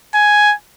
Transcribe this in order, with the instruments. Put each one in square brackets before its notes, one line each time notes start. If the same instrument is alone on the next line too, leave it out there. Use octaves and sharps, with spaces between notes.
[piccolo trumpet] G#5